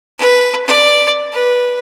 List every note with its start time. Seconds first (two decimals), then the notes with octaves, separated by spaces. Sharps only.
0.18 B4
0.66 D5
1.32 B4